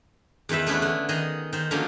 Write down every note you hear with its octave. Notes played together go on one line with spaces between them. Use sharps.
E2 D#3 E3 B4 E5
A3 B3 C#4 D4 E4 B4
D3
D#3 G#4 D#5
D#3 C5
D3 F3 F#3 A#3 C#4 D4